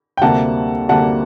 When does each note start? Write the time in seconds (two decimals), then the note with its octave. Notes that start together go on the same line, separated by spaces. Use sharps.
0.17 G5
0.22 D2 C3 G3 A#3 F#5 A5
0.89 D2 C3 G3 A#3 F#5 A5